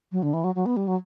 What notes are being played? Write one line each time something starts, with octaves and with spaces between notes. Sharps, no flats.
F#3
D3
E3
F#3
F#3
B3
G3
F#3